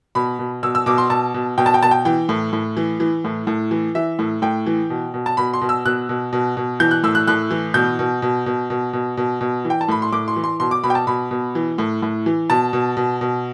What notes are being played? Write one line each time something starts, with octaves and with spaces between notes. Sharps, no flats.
B2 B5
B2
B2 E6
E6
B2 D6
C6
B2 A5
B2
B2 G5
A5
G5
B2 A5
G5
E3 G5
A2
A2
E3
E3
A2
A2
E3
E3 E5
A2
A2 G5
E3
B2
B2
A5
B2 B5
C6
B2
E6
B2 F#6
B2
B2
B2
E3 G6
F#6
A2 E6
F#6
A2 F#6
E3
B2 G6
B2
B2
B2
B2
B2
B2
B2
E3
G5
A5
A2 B5
C6
A2 D6
C6
E3
C6
B2 C6
D6
B2 B5
G5
A5
B2 B5
B2
E3
A2
A2
E3
B2 A5
B2
B2
B2